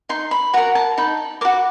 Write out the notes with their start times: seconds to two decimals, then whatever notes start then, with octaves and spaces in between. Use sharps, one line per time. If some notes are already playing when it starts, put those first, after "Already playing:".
0.09 D#4 C6
0.31 B5
0.53 F#4 A#4 A#5
0.75 A5
0.98 D#4 B5
1.41 A#4 D6
1.45 F#4